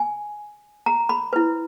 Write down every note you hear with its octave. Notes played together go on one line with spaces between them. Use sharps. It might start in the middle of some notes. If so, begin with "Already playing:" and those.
Already playing: G#5
A#5
B5
E4 B4